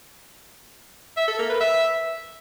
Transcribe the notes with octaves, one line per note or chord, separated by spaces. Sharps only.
E5
A4
A#3
B4
E5